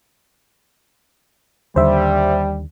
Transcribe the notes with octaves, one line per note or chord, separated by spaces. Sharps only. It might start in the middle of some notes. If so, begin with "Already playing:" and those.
D#2 D3 G3 C5 E5